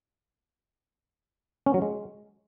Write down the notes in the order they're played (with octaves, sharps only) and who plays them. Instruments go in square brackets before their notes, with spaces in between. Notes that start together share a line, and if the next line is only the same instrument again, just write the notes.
[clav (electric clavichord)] C#4
F#3
G#3